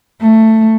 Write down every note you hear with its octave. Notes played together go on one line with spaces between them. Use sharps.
A3